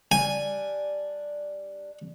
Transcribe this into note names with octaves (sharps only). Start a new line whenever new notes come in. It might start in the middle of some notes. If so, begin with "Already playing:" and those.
G3 D4 G#5